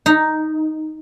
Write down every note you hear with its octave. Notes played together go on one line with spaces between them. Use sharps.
D#4